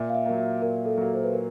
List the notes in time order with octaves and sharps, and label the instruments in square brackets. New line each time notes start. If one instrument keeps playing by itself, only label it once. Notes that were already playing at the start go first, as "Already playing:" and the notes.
Already playing: [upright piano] A#2 [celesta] E5
[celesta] F5
E5
[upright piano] F#3 A#3
[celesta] E5
[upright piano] A#2 [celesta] A#4
[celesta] A4
[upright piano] F#3 A#3
[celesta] C5
B4
A#4